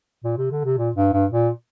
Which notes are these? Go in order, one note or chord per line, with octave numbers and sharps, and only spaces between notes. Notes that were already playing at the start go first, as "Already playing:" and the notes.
A#2
C3
D3
C3
A#2
G2
G2
A#2